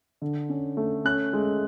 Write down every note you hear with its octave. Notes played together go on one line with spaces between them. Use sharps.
D3
C#4
A3
C#4 F#6
G#3